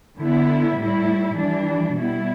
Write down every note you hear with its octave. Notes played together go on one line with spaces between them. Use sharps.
D3 B3 E4
A2 G3 E4
E3 G3 D4
B2 G3 B3 E4